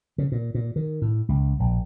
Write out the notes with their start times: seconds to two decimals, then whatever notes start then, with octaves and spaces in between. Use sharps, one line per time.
0.18 C#3
0.32 A#2
0.55 A#2
0.76 D#3
1.02 A2
1.29 C#2
1.60 A#1